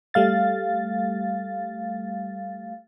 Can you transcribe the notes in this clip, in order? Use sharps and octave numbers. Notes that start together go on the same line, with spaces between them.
G3 A3 F5 A6